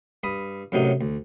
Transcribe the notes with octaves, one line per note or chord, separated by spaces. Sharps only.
G2 B5 D#6
F#2 A2 C3 F#3 D#4
D2